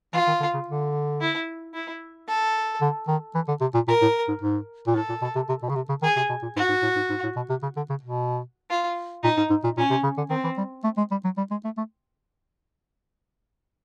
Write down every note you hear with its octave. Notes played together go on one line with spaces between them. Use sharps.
E3 F4
D#3
D3
C#3
D3
E4
E4
A4
D3
D#3
E3
D3
C3
A#2
A#2 A#4
A2
G#2
G#2
A#2
A2 A4
A#2
B2
C3
C3
B2
C#3
C3
C#3
D#3 G#4
C3
B2
A#2
G#2 F#4
G#2
A2
G#2
G#2
A2
B2
C3
C#3
D3
C#3
B2
F4
A#2 D#4
G#2
G#2
A#2
A#2 C#4
C3
C#3
D3
D#3 C4
E3
G3
A3
G#3
G3
F#3
G3
G#3
A3
A3